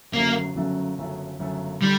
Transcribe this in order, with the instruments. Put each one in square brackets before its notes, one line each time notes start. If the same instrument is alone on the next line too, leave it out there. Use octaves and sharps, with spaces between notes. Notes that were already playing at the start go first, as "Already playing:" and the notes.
[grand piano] G1 F#2 C#3 F#3 A3 [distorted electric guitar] A#3
[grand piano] G1 F#2 C#3 F#3 A3
G1 F#2 C#3 F#3 A3
G1 F#2 C#3 F#3 A3
[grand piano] D3 [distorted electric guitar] G3